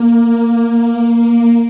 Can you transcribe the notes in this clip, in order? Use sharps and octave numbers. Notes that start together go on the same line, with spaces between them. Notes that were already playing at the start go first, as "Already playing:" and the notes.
Already playing: A#3
A#3